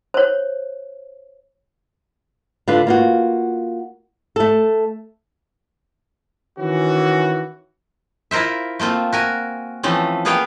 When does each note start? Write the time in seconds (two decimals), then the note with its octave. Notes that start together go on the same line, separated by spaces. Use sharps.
0.14 C5 C#5
2.68 D3 F4 B4
2.87 A#3 F4 F#4
4.36 A3 A4
6.59 D#3 E3 C#4 F#4
8.31 E4 F4 A#4 C5 E5
8.79 A3 A#3 C4 F4
9.13 F#4 A#4 G#5
9.83 E3 F3 A3 C4 C#4
10.25 A#3 B3 G#4 C#5 F5 G5